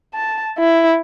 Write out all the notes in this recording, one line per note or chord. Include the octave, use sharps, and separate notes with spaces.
A5
E4